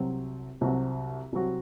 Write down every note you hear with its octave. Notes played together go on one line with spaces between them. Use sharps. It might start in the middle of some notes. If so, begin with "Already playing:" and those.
Already playing: C2 C3 F#3 C4 F#4
C2 C3 F#3 C4 F#4
C2 C3 F#3 C4 F#4